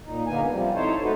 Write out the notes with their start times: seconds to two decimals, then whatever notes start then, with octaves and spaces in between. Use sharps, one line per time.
0.04 A#2 D#4
0.27 G#2 D3 A#3 B3 D#4 G#5
0.50 C3 F3 G3
0.74 D#4 E4 A4 C5 C#5
1.02 A3 C4 D#4 F#4 A4 B4